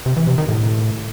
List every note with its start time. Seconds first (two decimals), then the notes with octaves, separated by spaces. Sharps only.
0.06 C3
0.17 E3
0.27 C3
0.38 D#3
0.49 A2